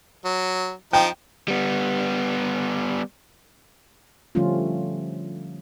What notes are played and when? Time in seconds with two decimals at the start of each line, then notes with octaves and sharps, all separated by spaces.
0.25 F#3
0.93 F3 D#4 G5
1.48 G3 B3
4.35 D3 F3 G3 A3 C#4 F4